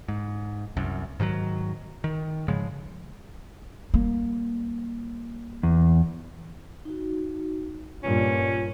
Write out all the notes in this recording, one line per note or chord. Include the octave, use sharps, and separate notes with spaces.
G#2
C2 F#2
G#2 D#3 F3 F#3
D#3
G#2 C#3 F3 G#3
G3 A#3
E2
D#4 F#4
G2 A#2 C#4 F4